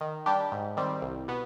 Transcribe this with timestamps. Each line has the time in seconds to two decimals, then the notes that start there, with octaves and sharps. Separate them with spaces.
0.01 D#3
0.26 G3 D4 G4
0.52 G#2
0.77 D#3 G3 C4
1.02 C2
1.28 B2 B3